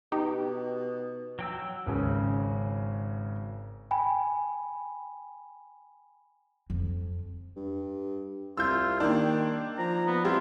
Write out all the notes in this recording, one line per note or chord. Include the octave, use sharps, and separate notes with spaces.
B2 D#4 G4
F#3 G5 E6
G#1 C#3 C#4
G5 G#5 B5
F2
G2
C2 F4 E6 G6
D#3 A#3 D4 G5
F3 A#5
B3
G3 C4 E4 F4